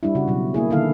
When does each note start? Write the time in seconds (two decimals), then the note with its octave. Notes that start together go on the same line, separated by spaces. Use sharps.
0.03 G3 D4 E4
0.15 C#3 F#4
0.28 B2 F#3
0.54 A#3 E4 G#4
0.70 D3 D#3 A#3 E4 A4 F5